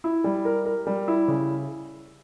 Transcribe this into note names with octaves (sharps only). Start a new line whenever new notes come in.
E4
G3
A#4
A#4
G3
E4
C#3